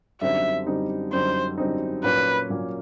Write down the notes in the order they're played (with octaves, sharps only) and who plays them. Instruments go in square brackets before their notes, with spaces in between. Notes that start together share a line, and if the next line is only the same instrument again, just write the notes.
[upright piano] F#2 D3 G3 C4 D#4 [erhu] E5
[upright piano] F#2 D3 G3 C4 D#4
[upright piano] F#2 D3 G3 C4 D#4 [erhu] C5
[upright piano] F#2 D3 G3 C4 D#4
[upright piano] A#2 F#3 A#3 C#4 [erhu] B4
[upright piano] A#2 F#3 A#3 C#4